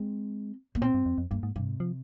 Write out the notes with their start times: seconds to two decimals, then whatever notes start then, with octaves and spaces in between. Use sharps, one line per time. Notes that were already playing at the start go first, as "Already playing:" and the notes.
Already playing: G#3 C4
0.75 A#3
0.81 A#2 C4
0.94 G2
1.06 F2
1.18 F2
1.31 G2 A#3
1.43 G#2
1.56 G2 C3
1.68 G#2
1.80 F3